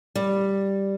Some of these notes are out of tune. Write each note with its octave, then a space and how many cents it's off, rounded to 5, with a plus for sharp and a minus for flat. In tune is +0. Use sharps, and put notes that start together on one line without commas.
G3 +0